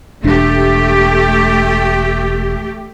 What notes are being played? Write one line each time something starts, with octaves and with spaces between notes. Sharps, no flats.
E1 A3 D4 G4